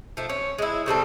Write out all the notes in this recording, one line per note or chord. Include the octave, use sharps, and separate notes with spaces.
F3 A3
C#4
G#3 E4
C#3 G3 C4 A4